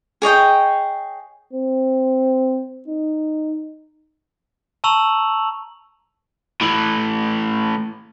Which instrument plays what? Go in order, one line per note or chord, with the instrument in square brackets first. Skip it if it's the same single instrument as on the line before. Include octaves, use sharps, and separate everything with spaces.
[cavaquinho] G#4 C#5 D#5 G5
[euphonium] C4
D#4
[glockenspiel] A5 A#5 C#6 E6 F7 F#7
[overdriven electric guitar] A2 E3